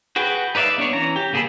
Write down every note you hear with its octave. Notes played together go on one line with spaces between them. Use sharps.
F#4 G#4 B4 G5
D#4 B4 D5 E5 F5
B3 D4 C#5
E3 C#4 A#5
G4
C#3 A#3 G#4 A4 B5